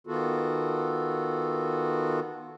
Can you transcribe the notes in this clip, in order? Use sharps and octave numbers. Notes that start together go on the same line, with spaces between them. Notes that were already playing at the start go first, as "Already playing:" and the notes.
D#3 B3 F4 F#4 A4